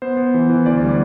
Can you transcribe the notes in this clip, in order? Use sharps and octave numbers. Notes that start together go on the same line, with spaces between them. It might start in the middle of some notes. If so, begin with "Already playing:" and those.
B3 C5
B3
E3
E3
D2 D5
G3